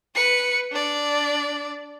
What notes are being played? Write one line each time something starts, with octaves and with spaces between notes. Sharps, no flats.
B4 C#7
D4 D5